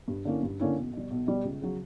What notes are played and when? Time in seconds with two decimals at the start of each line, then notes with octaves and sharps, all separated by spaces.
0.08 G2
0.25 D3 A#3 C#4 E4
0.43 G2
0.60 D3 A#3 C#4 E4
0.77 B1
0.93 B2 G3
1.10 B1
1.27 B2 G3
1.44 C#2
1.61 C#3 F#3